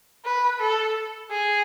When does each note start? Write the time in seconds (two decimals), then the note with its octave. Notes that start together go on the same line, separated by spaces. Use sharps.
0.25 B4
0.60 A4
1.31 G#4